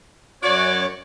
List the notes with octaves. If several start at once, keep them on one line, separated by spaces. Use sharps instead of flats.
F#2 F#4 C#5 D5 C#6